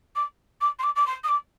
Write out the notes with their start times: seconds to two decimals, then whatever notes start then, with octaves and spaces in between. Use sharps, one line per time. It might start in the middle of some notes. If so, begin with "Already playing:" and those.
0.15 D6
0.61 D6
0.79 C6
0.83 D6
0.96 D6
1.06 C6
1.24 D#6
1.28 D6